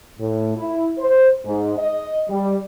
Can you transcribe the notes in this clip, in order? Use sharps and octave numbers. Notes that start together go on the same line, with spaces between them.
A2
E4
C5
G#2
D#5
G3